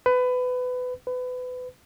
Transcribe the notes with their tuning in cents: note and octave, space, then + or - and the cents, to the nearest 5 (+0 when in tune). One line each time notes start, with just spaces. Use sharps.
B4 +25
B4 +30